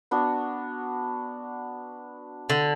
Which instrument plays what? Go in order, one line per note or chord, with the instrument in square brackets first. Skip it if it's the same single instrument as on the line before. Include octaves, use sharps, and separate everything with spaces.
[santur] B3 D4 F#4
[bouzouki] D3